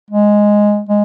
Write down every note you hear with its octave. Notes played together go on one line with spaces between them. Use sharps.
G#3
G#3